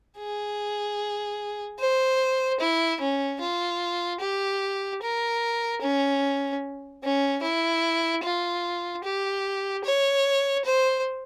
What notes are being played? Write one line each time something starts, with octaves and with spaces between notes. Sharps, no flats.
G#4
C5
E4
C#4
F4
G4
A#4
C#4
C#4
E4
F4
G4
C#5
C5